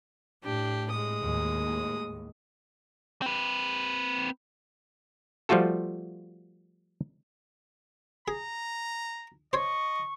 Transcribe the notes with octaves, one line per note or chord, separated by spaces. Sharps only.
A2 D4 G4
G#3 D#6
D#2 A2
C4 B4
F3 G3 A3 F4 F#4 A4
G#4 A#5
C5 C#5 D#5 C#6